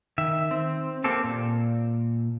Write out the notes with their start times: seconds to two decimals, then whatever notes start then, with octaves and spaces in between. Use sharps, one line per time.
0.18 D#3 E5
0.51 C4
1.04 A#3 C4 G4 A4
1.24 A#2